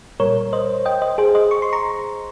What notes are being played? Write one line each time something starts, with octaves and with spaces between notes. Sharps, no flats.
A#2 G3 A#4 C#5
C5 D#5
D#5 G5
C5 D#5
G#4 C5
C5 D#5
C#6
C6
A#5 C#6